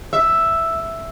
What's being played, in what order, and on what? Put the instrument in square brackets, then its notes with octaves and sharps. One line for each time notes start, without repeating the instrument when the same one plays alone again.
[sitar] E5